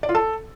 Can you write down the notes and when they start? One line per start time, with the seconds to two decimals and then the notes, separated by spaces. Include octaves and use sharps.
0.03 D5
0.09 F4
0.15 A4